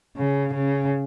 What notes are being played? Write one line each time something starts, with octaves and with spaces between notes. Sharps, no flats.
C#3
C#3